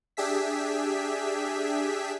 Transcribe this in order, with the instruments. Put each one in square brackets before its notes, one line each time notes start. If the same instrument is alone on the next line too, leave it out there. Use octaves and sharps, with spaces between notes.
[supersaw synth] D4 G4 G#4 E5 B6